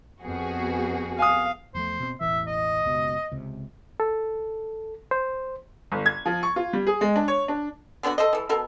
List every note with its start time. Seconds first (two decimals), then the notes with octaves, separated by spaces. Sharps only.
0.22 F2 B3 F#4 G#4
1.19 F5 G#5 D#6
1.75 E2 F3 A3 C5
2.00 B2 C4
2.21 E1 A1 E3 E5
2.47 D#5
2.83 F#1 C#2 B2
3.31 C#2 C3
4.00 A4
5.11 C5
5.92 G1
6.06 G#6
6.26 F3
6.43 C#6
6.56 F4
6.73 G3
6.87 G#4
7.01 G#3
7.16 D4
7.28 C#5
7.48 D4
8.03 D3 B3 D4 F#4
8.18 A4 C5 D#5
8.33 E3 A4
8.49 B2 A4 A#4